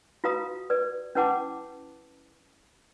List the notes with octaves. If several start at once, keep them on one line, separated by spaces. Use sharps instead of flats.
F4 F#4 B4 F5 A#5 D#6
B4 D5
C#4 E4 B4 F#5 A5 D6